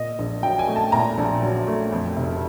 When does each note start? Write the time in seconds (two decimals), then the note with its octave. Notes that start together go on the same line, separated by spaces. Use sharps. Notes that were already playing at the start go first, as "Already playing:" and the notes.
Already playing: A#2 D#5
0.19 A#1
0.43 F#3 G5
0.59 G#5
0.68 A3
0.76 A5
0.92 A#2 A#5
1.18 A#1
1.42 F#3
1.67 A3
1.92 F2
2.17 F1